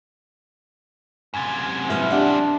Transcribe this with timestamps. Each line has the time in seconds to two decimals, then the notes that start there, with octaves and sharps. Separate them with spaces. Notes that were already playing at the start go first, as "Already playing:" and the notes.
1.34 F#2 C3 G#5 G#6 A6
1.89 F3 B3 E4 E5 F6
2.11 D4 G4 D5 F#5